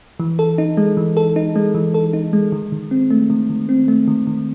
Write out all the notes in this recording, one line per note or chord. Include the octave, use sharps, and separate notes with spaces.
E3
A4
D#4
G#3
E3
A4
D#4
G#3
E3
A4
D#4
G#3
D#3
D#3
C4
A3
D#3
D#3
C4
A3
D#3
D#3